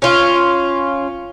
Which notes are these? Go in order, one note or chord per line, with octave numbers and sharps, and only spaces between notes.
C#4 F4